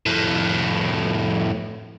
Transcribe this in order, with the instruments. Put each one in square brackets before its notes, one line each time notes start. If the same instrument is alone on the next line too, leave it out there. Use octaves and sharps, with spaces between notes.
[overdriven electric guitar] F2 A2